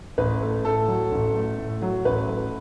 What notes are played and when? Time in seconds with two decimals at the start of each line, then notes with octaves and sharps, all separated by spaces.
0.18 A1 B4
0.41 A3
0.65 A2 A4
0.88 F#3
1.11 A1
1.35 A3
1.58 A2
1.82 F#3
2.05 A1 B4
2.29 A3